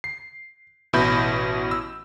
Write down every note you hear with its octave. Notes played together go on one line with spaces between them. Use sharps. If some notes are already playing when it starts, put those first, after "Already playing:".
C7
A1 B2 E4 B5 G6
E6